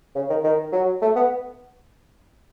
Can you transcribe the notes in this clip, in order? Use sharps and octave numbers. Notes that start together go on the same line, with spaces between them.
C#3
D#3
D#3
F#3
A3
B3